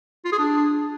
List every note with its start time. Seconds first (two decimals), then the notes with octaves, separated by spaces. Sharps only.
0.25 F4
0.32 G#4
0.39 D4